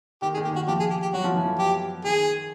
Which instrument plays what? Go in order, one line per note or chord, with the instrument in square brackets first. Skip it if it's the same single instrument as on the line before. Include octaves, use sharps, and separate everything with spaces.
[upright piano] D#3 [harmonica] G4
[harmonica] G#4
[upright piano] D#3
[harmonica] G4
[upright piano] D#3 [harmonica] F#4
[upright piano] F3 [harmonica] G4
[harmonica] G#4
G4
G4
[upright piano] F#3 [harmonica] F#4
[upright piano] F3
E3
F3
[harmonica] G4
[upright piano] D#3 [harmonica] G#4